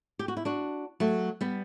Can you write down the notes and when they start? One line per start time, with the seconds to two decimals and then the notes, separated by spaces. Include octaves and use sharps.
0.19 G4
0.28 F#4
0.37 E4
0.45 D4 F#4
1.00 F#3 A3
1.41 G3 B3